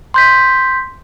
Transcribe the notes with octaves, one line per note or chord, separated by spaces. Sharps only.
C6 G6 B6